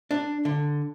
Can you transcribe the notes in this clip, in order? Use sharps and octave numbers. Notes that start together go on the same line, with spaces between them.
D4
D3